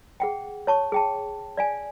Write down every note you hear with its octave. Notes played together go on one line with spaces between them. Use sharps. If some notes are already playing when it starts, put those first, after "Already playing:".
G#4 F#5 G5
C#5 A5 C#6
G#4 G5 A5
D5 F5 G#5